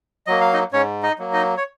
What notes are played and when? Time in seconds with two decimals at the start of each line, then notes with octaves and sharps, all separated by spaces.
0.27 F#3 A#3 D#5
0.41 F5
0.53 D#4 D#5
0.72 G#2 C#4 C#5
1.03 D#4 D#5
1.19 F#3 A#3
1.33 D#4 D#5
1.57 C#5